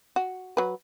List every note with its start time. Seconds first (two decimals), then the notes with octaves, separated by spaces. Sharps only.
0.16 F#4
0.57 F#3 B4